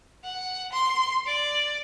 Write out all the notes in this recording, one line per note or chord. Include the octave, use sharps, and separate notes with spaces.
F#5
C6
D5